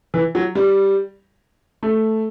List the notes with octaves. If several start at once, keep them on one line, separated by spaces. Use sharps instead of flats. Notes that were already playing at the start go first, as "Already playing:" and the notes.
E3
F#3
G3
A3